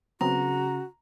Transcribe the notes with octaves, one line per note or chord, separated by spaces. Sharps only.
C#3 F#3 B3 C4 F#4 A#5